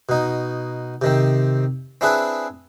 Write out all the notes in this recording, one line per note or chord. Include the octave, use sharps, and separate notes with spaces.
B2 D#4
C3 D#3 C4
C4 D4 E4 G#4 B4